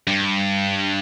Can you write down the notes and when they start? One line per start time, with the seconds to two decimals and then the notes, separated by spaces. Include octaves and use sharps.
0.07 G2